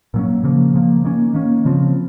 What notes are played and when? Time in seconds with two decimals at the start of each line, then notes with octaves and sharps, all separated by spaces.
0.14 A#2 F#3 A#3 C#4
0.43 C#3 F3 A#3
0.74 C#3 F3 A#3
1.05 D#3 A#3 C#4
1.34 D#3 A#3 C#4
1.65 C#3 F3 C4